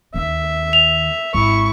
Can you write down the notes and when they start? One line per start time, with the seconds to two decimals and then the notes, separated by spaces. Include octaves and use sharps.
0.14 D#2 D#3 E5
0.73 F7
1.35 G#1 E4 C#6